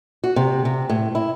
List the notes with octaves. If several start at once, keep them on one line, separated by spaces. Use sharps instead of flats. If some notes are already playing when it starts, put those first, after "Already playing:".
F#4
C3
C3
A2
E4